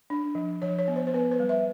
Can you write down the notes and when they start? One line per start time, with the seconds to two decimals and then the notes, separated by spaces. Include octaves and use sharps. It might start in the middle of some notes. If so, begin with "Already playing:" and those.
0.10 D4
0.35 F3
0.62 F3 C#5
0.79 C#5
0.88 B3
0.96 C5
1.07 C5
1.14 B3 B4
1.32 B4
1.40 G3
1.49 E5